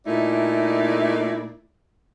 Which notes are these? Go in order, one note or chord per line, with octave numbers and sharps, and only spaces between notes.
A#2 A3 D#4 E4 D5